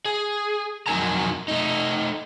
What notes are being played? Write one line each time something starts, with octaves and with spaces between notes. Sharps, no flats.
G#4
F2 F#3 D#4 A#4 G#5 A#5
A3 D#4